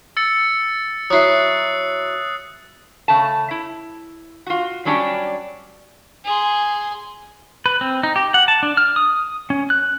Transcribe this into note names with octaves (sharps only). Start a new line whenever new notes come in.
E6 A6 C#7
F#3 E4 D#6 F#6 C7
C#3 A3 A5
E4
F4 F#4
F#3 G3 C#4 D4 E4 G4
G#4 C6
B4
C4
D#4
G4
F#5
A5
D4
F6
D#6
C#4
F#6